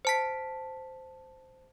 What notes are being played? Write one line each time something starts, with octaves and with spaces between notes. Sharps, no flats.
C5 A5 B6